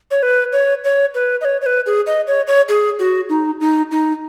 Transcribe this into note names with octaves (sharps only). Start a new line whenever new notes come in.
C#5
B4
C#5
C#5
B4
D#5
C#5
C#5
B4
G#4
D#5
C#5
C#5
G#4
F#4
D#4
D#4
D#4